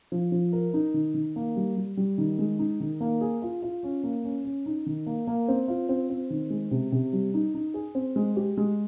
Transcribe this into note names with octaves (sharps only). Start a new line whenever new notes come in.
F3
F3
A#4
D#4
D#3
D#3
A#3
G3
G3
G3
D#3
G#3
D#4
D#3
A#3
G#4
F4
F4
C#4
A#3
C#4
C#4
D#4
D#3
A#3
A#3
C4
F4
C4
C4
D#3
G#3
C3
C3
G3
D#4
D#4
G#4
C4
G#3
G4
G#3